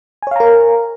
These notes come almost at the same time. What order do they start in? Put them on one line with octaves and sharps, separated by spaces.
G#5 C#5 F5 A#5 A#4